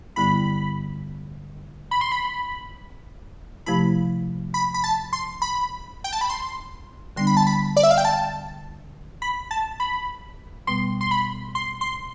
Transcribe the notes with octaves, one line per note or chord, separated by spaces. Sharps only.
G2 D3 G3 B3 E4 B5
B5
C6
B5
C3 F3 A3 E4 G4 B5
B5
B5
A5
C6
B5
G5
A5
B5
C6
D3 G3 B3 D4 C6
B5
A5
B5
D5
E5
F5
G5
A5
B5
A5
B5
B2 G3 B3 C6
C6
B5
C6
C6